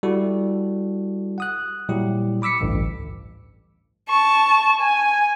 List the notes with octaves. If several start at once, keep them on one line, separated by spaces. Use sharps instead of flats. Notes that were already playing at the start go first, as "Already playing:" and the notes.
G3 E4 F#4 A4
F#5 D#6 F#6
A#2 F#3 G3 E4 G4
B5 D6 E6 B6 C#7
A1 D2 G2
A5 C#6
G#5